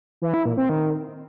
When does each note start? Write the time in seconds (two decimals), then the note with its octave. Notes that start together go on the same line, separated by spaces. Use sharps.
0.22 E3
0.34 E4
0.46 A#2
0.57 C4
0.69 D#3